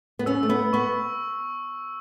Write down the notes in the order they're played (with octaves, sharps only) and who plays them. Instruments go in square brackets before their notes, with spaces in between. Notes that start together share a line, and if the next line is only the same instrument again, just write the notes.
[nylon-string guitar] B3
[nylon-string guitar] C#4 [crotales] E6
[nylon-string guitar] A3
B3
[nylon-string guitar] B3 [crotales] C#6